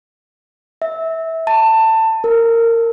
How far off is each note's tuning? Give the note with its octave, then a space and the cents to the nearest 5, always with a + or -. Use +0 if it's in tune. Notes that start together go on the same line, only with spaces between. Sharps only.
E5 -20
A5 +20
A#4 -20